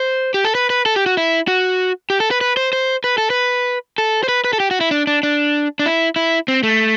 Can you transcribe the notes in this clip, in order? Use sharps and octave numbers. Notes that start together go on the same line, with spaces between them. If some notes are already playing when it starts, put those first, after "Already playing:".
Already playing: C5
G4
A4
B4
B4
A4
G4
F#4
E4
F#4
G4
A4
B4
B4
C5
C5
B4
A4
B4
A4
C5
B4
B4
A4
G4
F#4
E4
D4
D4
D4
D4
E4
E4
C4
A3